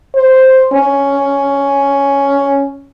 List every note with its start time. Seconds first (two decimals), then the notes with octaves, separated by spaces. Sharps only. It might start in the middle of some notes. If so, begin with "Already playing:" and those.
0.15 C5
0.73 C#4